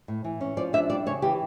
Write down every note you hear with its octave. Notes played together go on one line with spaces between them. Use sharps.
A2
E3
C#4
F3 D5
D4 E5
G3 D5
C#3 C#5
E3 G4